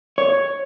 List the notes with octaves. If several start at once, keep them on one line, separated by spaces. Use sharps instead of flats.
C#5